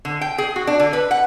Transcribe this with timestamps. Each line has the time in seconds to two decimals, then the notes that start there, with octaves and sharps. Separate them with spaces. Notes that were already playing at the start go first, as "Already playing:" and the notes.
0.05 D3
0.21 G5
0.38 G#4
0.56 F#4
0.67 D4
0.80 D3
0.93 B4
1.11 F#5